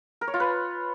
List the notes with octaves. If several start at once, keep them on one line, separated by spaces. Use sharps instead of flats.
A#4
C#5
F4
B4